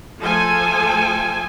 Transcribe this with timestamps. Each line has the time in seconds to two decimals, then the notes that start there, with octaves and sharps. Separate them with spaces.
0.20 F3 A3 A4 C5 G#5